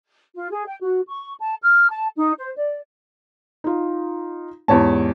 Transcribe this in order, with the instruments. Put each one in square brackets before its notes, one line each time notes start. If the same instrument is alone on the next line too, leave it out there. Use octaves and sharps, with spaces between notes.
[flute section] F4
G#4
G5
F#4
C#6
A5
F6
A5
D#4
C5
D5
[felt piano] D#4 F4
[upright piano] E2 C#5 A5 [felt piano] G#2 G4